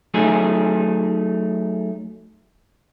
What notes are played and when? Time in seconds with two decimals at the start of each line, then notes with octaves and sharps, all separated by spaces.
0.14 F#3 A3 D#4 G#4